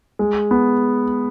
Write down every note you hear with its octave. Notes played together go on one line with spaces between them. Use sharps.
G#3
B3